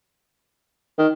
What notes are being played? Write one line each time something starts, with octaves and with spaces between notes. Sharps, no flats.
D#3